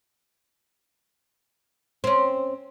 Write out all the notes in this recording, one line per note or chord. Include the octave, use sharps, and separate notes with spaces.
C4 C#4